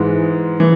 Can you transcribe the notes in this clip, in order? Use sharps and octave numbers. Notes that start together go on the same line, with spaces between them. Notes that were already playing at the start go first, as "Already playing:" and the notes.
Already playing: G#2 E3 G#3
E3